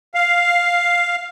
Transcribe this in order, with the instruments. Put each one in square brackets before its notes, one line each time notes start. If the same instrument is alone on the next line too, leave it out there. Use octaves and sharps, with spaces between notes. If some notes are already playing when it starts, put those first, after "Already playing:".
[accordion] F5